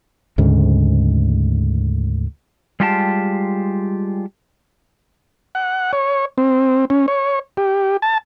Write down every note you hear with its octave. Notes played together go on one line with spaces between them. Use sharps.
D2 G#2 C#3
G3 G#3 F4 G4 G#5 A5
F#5
C#5
C4
C#4
C#5
G4
A5